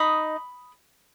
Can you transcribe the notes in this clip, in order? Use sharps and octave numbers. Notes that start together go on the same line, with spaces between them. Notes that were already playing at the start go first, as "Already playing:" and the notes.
Already playing: D#4 D#5 B5 D#6